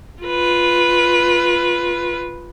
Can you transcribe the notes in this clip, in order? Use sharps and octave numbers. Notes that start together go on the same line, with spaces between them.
F4 B4